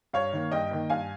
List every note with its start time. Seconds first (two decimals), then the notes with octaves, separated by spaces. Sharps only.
0.13 G2 C#5 F5
0.33 D#3 A#3
0.51 G2 D#5 G5
0.71 D#3 A#3
0.90 G2 F5 G#5